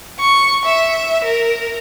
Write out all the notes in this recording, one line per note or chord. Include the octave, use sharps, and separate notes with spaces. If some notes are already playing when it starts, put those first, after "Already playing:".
C#6
E5
A#4